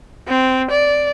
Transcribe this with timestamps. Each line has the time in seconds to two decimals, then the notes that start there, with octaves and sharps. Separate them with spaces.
0.28 C4
0.71 D5